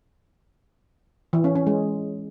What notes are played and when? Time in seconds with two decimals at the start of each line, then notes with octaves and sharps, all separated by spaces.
1.33 E3
1.44 C#4
1.55 C#4
1.67 G#3